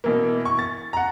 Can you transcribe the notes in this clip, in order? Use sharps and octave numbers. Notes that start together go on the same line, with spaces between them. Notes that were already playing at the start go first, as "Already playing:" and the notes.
B2 E3 A#3
C#6
A6
F#5 A#5